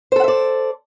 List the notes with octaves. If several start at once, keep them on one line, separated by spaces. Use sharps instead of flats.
A4 C5 D5 E5 F#5